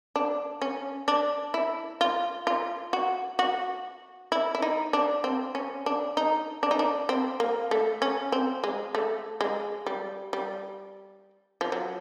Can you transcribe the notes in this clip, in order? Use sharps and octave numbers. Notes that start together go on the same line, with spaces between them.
D4
C#4
D4
E4
F4
F4
F#4
F#4
E4
E4
D#4
D4
C4
C#4
D4
D#4
D4
D#4
D4
C4
A#3
A3
C#4
C4
G#3
A3
G#3
G3
G3
F3
F#3